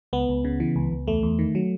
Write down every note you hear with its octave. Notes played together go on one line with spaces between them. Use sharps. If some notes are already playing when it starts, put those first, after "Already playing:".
C#2 B3
C#2
C#3
E3
C#2
C#2
E2 A3
E2
D#3
F#3